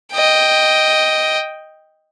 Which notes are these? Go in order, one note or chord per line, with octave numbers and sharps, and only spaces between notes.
D#5 G5